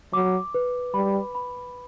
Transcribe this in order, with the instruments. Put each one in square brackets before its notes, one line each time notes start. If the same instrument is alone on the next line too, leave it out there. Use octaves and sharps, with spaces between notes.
[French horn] F#3 [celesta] D6
[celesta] B4
[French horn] G3 [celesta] B5
[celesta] B5